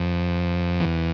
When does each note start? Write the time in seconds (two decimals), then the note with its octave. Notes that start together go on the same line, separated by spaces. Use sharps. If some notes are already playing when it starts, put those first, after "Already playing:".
Already playing: F2
0.80 E2